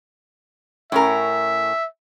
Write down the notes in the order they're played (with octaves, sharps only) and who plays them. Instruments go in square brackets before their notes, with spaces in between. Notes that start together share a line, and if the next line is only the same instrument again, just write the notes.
[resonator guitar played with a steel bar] A2 C#4 A#4 [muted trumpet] E5